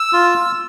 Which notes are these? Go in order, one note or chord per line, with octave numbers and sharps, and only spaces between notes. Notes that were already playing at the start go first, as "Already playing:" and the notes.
Already playing: E6
F4